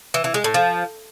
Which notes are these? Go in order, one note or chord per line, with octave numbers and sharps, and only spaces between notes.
E3
E3
G#3
A2
F3